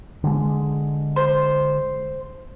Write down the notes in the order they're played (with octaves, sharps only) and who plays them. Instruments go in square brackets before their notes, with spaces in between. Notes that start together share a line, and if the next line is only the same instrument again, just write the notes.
[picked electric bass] D3 G#3
[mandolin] C5